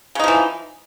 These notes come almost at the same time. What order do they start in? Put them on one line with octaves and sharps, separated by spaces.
C#3 D#4 F3 E3